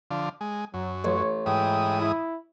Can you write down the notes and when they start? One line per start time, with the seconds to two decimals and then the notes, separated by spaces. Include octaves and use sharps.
0.11 D3 F3
0.41 G#3
0.74 F#2 F#3
1.04 A1 C#5
1.46 G#2 E3 G5 D#6
2.00 E4